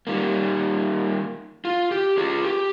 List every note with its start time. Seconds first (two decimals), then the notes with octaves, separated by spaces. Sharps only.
0.07 D#3 G3 A#3
1.65 F4
1.91 G4
2.18 F4 G#4
2.45 G4